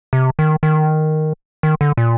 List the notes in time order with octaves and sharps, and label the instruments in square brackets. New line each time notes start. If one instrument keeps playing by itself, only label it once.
[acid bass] C3
D#3
D#3
D#3
D3
A#2